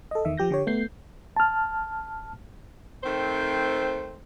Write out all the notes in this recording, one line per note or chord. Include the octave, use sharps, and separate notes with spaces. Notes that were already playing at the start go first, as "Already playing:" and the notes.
A4 D#5
E2 D#3 E5
F3 G4 G6 A#6
D3 G4 C#5
A3 B3 G6 C7
A5 F6
D#3 A3 C4 C5